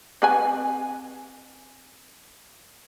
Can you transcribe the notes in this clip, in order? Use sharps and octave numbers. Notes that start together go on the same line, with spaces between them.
C4 B4 G#5